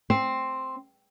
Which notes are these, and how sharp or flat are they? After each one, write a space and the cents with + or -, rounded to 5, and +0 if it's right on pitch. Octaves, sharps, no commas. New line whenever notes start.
C4 +5